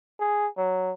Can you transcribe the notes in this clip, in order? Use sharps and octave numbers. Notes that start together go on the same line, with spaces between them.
G#4
F#3